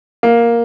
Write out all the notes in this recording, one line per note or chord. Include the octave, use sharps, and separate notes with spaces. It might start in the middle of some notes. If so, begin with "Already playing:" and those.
A#3